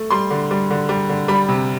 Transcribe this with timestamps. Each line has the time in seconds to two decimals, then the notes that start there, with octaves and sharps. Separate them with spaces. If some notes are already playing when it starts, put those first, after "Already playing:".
Already playing: A3
0.11 G3 C6
0.30 D3
0.51 G3
0.70 D3
0.89 G3
1.09 D3
1.28 G3 B5
1.48 C3